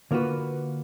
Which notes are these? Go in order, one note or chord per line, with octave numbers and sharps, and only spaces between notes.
D3 A#3 F4 F#4 B4